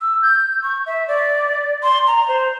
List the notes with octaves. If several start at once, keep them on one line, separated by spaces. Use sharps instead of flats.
E6
G6
C#6
E5
D5
C6
A#5
C5